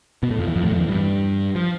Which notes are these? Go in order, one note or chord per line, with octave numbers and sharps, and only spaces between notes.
B2 B3
A2 A3
F2 F3
E2 E3
F2 F3
A2 A3
F2 F3
E2 E3
G2 G3
F3